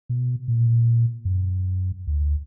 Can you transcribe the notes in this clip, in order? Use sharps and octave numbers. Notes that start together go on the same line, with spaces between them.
B2
A#2
F#2
D2